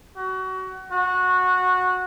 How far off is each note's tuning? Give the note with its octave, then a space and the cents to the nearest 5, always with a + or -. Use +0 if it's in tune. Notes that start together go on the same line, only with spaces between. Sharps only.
F#4 +25
F#4 -15